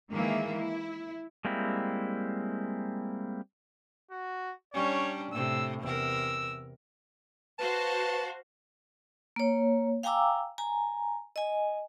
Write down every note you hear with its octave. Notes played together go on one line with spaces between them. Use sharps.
D#3 E3 G#3 A#3 G#4 E5
E4
G3 G#3 A#3 C4 E4
F#4
G3 C#4 D4 C#5
A2 C3 E6
E2 C3 A#4 E6
F#4 B4 C5 F5 A5
A#3 C#5
F5 G5 G#5 A#5 D6 E6
G#5 A#5
D#5 G#5